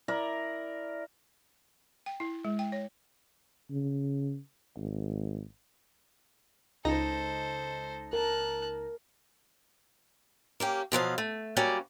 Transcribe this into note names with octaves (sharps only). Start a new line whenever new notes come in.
E4 A#4 D5
G5
E4
G#3
G5
C#5
C#3
G#1
C#2 D#4 A4 C5 A#6
A#4 A5 F#6
A#3 C#4 G4
B2 F3 F#3 F5
A3
F#3 G3 A#3 C#4 D5